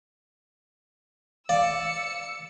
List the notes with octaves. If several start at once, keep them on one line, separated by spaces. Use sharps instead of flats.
D5 F5 E6 C#7